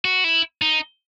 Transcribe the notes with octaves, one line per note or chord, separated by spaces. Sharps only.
F#4
E4
D#4